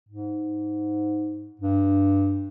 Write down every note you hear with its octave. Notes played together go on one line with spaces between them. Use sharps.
G#2
G2